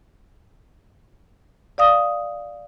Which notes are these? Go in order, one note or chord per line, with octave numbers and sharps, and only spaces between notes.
D5 F5 D#6